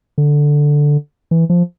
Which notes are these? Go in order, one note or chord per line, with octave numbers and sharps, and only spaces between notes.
D3
E3
F3